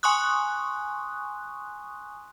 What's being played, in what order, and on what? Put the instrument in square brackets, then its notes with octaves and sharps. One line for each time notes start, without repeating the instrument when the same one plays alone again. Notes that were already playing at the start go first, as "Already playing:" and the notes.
[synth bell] G#5 C6 C#6 D#6 F#6